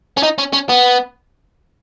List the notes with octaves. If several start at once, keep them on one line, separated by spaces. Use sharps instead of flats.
C#4
D#4
C#4
C#4
B3